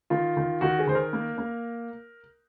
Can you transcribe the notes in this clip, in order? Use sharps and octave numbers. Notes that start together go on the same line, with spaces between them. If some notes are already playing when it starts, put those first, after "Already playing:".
D#3 F4
D#3
D#3 F#4
G#4
D#3 C5
A#4
A#3
A#3